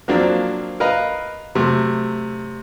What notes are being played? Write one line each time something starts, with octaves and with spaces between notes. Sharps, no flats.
F3 F#3 A#3 C4 D4
A#4 B4 D#5 F5
C3 F#3 A3